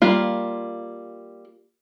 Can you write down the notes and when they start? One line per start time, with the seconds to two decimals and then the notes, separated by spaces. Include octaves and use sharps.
0.02 G3 A#3 F4